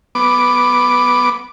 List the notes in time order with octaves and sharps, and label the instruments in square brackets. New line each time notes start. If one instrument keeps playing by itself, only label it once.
[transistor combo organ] B3 D6